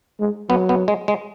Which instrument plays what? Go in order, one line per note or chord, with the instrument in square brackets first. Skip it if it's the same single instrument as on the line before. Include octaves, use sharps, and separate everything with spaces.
[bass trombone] G#3
[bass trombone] F#3 [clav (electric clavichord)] B3
[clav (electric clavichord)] B3
G#3
G#3